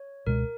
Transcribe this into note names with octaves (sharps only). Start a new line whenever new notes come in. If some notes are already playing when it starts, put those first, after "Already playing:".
Already playing: C#5
C#2 B2 G#3 A#4